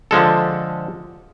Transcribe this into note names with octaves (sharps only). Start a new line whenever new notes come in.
D3 F3 G#3 A4